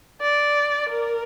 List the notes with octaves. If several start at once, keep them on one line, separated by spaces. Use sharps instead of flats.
D5
A#4